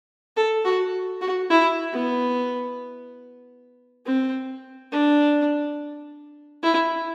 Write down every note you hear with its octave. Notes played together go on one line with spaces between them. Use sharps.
A4
F#4
F#4
E4
B3
C4
D4
E4